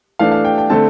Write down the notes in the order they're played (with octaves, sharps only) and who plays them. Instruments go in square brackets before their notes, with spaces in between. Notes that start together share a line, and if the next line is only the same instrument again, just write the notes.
[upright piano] E3 A3 D4 F5
F5
G5
G5
D3 A3 C4 A5